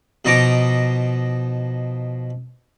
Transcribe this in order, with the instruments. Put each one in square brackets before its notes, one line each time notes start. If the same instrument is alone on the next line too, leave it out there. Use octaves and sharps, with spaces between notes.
[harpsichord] B2 F3 D#4 A#5 D6